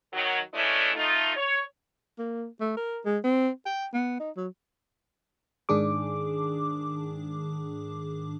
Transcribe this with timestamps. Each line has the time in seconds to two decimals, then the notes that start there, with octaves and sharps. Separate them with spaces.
0.13 D#3 F#3
0.54 E3 G#3 A3 C#4 D4 E4
0.96 A3 D#4 F4
1.36 C#5
2.18 A#3
2.60 A3
2.77 A#4
3.05 G#3
3.24 C4
3.66 G5
3.94 B3
4.20 D#4
4.36 F#3
5.69 G#2 D#3 D4 G#4 D6